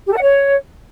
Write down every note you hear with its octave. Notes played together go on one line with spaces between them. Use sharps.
G4
A4
F#5
C#5